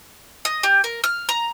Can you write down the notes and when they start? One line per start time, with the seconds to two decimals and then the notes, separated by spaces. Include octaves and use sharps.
0.45 D#5
0.63 G4
0.84 A#4
1.04 F6
1.29 A#5